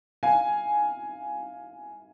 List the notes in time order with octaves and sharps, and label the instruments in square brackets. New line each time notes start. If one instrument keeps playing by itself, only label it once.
[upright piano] F5 G#5